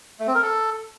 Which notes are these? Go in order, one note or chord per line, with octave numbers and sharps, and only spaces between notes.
A3
C4
A#4
A4